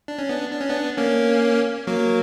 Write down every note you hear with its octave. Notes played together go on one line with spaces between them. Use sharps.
D4
C#4
B3 D4
D4
C#4
B3 D4
A#3 C#4
F#3 A#3